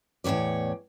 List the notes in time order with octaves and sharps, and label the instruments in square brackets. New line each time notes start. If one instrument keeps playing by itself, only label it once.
[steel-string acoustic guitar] E2 A2 C3 C#5 D5